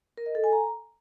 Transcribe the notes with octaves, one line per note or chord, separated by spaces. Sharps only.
A#4
D#5
A4
G#5
A#5